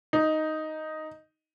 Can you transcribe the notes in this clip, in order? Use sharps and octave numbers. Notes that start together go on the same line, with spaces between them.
D#4